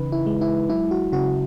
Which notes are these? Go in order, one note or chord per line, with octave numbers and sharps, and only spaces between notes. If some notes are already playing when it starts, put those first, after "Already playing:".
Already playing: C#3 E3 D#4 B4
E4
G#3
E4
F#3 E4
F#4
C#3 F#4